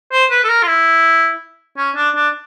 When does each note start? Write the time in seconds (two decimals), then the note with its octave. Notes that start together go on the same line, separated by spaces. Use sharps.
0.12 C5
0.31 B4
0.44 A4
0.49 A#4
0.63 F4
0.67 E4
1.78 C#4
1.96 D4
2.15 D4